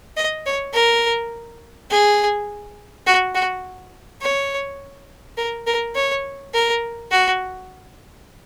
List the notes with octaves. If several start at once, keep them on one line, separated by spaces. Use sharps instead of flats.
D#5
C#5
A#4
G#4
F#4
F#4
C#5
A#4
A#4
C#5
A#4
F#4